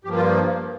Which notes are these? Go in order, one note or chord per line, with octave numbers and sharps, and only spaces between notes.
G2 F3 A#3 G4
F4